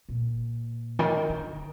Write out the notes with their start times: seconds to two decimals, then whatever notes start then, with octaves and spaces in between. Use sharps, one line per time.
0.09 A#2
0.99 D#3
1.30 D3